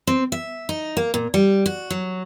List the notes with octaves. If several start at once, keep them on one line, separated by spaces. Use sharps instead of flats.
C4
E5
D#4
A#3
A#2
G3
F#4
F#3